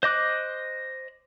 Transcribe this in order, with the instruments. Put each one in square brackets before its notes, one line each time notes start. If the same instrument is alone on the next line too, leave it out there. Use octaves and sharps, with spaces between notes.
[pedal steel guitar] C5 D#5 D6 F#6